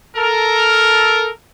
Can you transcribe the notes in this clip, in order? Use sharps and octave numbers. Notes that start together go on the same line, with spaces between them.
A4 A#4